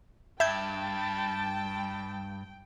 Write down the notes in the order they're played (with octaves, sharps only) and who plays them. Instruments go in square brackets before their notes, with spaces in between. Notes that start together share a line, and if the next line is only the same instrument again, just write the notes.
[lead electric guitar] G2 [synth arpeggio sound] E5 G6 G#6 [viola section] G5 [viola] A5